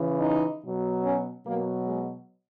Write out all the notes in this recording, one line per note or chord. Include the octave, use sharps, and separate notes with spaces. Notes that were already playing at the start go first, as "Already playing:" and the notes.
Already playing: C#3 E3
D#4
B2 F#3
C#4
B2 F#3 A#3
G#3